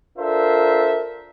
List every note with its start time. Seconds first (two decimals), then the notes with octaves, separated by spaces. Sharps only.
0.18 D4 F4 A4 A#4 C5 E5